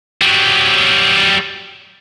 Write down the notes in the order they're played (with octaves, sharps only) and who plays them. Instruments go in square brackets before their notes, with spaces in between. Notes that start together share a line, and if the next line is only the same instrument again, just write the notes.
[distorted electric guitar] F#3 G3